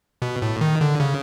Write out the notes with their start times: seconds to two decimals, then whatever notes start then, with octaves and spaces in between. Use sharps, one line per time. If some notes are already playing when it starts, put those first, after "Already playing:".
0.22 B2
0.42 A2
0.61 D#3
0.81 D3
1.00 C#3